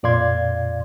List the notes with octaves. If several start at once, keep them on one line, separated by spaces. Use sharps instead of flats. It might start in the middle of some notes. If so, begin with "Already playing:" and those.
F2 A#2 D5 F5 C6 G#6